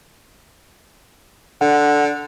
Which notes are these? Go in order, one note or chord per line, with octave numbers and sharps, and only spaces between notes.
D3 F#5